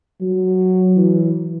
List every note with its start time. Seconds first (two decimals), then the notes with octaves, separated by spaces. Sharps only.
0.21 F#3
0.96 E3